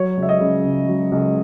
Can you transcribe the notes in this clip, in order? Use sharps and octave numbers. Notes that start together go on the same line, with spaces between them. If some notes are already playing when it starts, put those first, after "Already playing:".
Already playing: F#3 C#5
C#2
E5
D#5
C#3
C#2
F#3
C#2